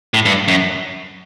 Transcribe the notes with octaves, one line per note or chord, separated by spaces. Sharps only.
A2
G2
F#2